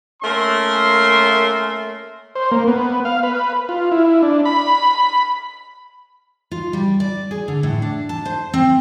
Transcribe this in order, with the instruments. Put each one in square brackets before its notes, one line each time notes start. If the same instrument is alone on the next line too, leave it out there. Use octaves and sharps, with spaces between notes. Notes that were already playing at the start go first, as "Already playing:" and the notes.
[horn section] A3 A#3 C#4 A#4 C6
[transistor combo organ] C5
A#3
B3
F5
B4
F4
E4
D4
B5
B5
[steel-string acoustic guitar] F4
G3
D5
G#4
D3
A2
D4
A5
C5
C4